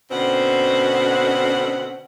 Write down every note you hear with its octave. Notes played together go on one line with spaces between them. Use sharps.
B2 D3 C4 C#4 F#5